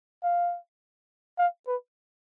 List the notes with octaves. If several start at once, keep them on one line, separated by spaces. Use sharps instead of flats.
F5
F5
B4